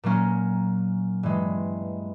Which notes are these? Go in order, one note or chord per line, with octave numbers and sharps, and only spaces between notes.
A#2 F#3 A#3 C#4
G2 E3 G#3